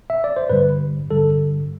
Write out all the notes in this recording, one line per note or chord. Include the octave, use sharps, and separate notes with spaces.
E5
D5
C5
G2 D3 G3 B4
G2 D3 G3 A4